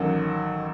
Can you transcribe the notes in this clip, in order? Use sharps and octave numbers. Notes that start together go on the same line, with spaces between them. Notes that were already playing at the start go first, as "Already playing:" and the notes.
Already playing: A1 D#3 F#3